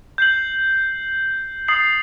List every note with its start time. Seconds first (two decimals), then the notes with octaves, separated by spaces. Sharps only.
0.18 G6 C7 F#7
1.68 D#6 A6 C7 F#7